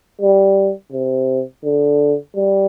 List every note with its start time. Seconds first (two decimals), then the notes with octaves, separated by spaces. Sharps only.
0.21 G3
0.92 C3
1.64 D3
2.36 G3